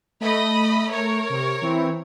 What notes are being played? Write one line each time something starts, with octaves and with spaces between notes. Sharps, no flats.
A3 D#5 B5
A#4 C#5
C3
E3 C4 E4